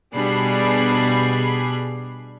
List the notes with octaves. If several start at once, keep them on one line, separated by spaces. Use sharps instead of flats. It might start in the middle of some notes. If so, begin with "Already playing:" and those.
B2 G3 D4 G#4 B5 C7